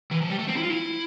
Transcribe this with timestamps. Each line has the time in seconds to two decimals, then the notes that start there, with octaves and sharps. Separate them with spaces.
0.11 E3
0.21 F3
0.30 G3
0.39 A3
0.47 C4
0.57 E4
0.63 F4
0.71 E4